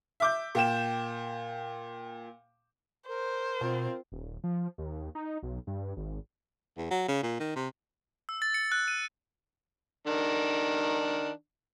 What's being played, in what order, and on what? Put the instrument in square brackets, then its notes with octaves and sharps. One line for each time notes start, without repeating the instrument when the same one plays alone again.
[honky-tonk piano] E5 D6 G6
A#2 G5 E7
[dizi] A#4 [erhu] C5
[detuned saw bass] B2 [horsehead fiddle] C4 F4
[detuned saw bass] D#1
F3
D#2
D#4
B1
G2
G#1
[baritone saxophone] E2
F#3
C#3
A#2
D#3
C3
[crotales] E6
A6
C#7
F#6
D#7
[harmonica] D#3 D4